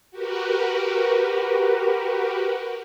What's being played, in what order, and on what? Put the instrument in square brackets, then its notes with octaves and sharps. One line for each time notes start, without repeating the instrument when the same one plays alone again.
[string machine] F#4 G4 A#4 B4